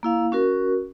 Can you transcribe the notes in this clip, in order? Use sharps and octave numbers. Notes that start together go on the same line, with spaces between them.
A#3 E4 F5
C#4 F#4 A#4